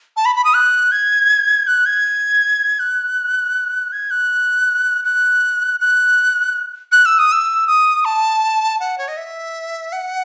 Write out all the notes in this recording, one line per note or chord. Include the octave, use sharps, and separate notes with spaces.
A5
B5
B5
D#6
F#6
G#6
F#6
G#6
F#6
G#6
F#6
F#6
F#6
F#6
E6
D#6
E6
D#6
A5
F#5
C#5
D#5
E5
F#5